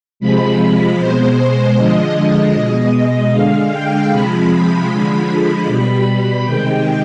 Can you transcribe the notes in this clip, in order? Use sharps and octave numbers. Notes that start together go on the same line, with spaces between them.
C3 F3 G#3 B5
B2 G#3 C5
D3 F3 G#3 D#5
B2 G#3
D3 G#3 F5
G5
C3 F3 G#3 B5
D3 F3 G#3 B5
B2 G3
C3 D#3 G#3 G5